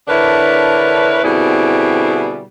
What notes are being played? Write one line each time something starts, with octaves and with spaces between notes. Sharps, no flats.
D3 D4 E4 A#4 B4 C#5
B2 D3 G3 C4 E4 G#4